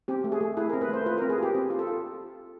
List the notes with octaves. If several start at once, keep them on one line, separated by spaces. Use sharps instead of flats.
C4 G4
A3
G#4
A3
E4 G#4
A#4
C4
B4
A3 C5
F4 B4
A#4
C4
G#4
F4 G4
C4
F4
A4
F4